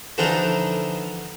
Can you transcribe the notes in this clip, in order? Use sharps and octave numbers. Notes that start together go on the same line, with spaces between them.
D3 E3 F3 D4 D#4